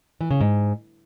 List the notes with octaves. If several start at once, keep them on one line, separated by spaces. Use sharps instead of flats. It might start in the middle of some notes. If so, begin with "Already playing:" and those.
E3
C#3
G#2